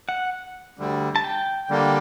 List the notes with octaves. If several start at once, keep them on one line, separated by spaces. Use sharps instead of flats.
F#5
D2 D3 G3
A5
G5
D3 G3 A#3